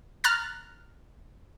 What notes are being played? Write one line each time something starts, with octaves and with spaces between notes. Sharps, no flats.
A#5 F6 F#6 A6